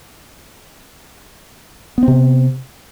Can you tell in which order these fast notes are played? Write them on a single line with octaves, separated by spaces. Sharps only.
B3 C4 C3